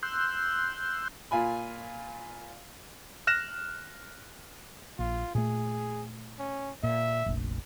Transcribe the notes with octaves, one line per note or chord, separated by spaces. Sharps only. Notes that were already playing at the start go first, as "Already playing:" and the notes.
C6 E6 F#6 G6
A#2 F4 G#5 B5
F6 F#6 A#6 E7
A#1 F4
A#2 A3 G#4
C#4
A#2 E5
F1 A#1